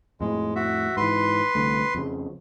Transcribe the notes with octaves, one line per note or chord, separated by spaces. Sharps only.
F2 A2 G#3
F#4 E5
G#2 E3 B4 C6
C2 D3 A3
F2 C#3